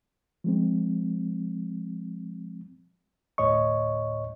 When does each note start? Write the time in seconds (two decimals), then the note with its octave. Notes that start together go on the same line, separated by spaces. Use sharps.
0.44 F3 G#3 C4
3.38 D2 A2 C#5 D#5 C#6